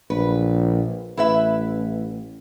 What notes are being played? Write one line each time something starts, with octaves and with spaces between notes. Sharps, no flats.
A#1 B4
A1 E4 B4 E5